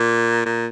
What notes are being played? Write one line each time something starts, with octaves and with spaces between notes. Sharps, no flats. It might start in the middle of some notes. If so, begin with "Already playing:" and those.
Already playing: A#2
A#2